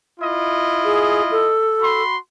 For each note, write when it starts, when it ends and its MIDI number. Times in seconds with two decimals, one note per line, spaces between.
0.20 1.52 64
0.20 1.52 65
0.20 1.52 75
0.85 1.23 68
1.31 2.02 69
1.80 2.15 66
1.80 2.15 83
1.80 2.15 84